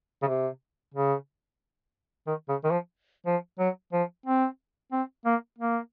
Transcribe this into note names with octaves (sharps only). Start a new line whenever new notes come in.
C#3
C3
C#3
D#3
C#3
D#3
F3
F3
F#3
F3
C4
C4
A#3
A#3